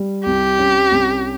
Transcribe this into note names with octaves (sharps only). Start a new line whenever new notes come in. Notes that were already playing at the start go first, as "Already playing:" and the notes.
Already playing: G3
C2 G4
C#4
C2